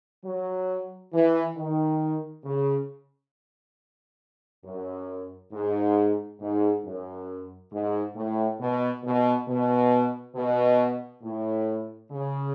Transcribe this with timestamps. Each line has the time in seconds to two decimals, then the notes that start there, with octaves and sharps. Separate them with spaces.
0.25 F#3
1.13 E3
1.56 D#3
2.45 C#3
4.64 F#2
5.53 G#2
6.40 G#2
6.85 F#2
7.72 G#2
8.16 A2
8.60 B2
9.04 B2
9.48 B2
10.36 B2
11.24 A2
12.12 C#3